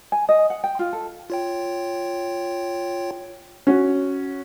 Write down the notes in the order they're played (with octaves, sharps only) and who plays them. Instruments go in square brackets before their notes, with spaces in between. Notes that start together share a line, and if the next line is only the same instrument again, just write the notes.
[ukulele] G#5
D#5
F#5
G5
F4
A4
[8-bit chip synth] F4 C#5 G5
[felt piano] C#4 F#4